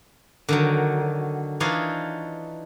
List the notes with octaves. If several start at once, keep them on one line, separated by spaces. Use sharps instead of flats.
D3 D#3 F#3
E3 D4 D#4 F4 C#5 C6